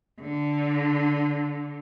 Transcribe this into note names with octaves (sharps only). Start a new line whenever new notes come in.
D3